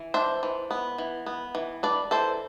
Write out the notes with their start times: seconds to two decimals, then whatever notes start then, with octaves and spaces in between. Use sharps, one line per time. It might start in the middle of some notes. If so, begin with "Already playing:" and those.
Already playing: E3
0.14 D4 C5 E5
0.43 E3
0.71 B3
0.98 E3
1.26 B3
1.55 E3
1.83 D4 B4 D5
2.11 E3 A4 C5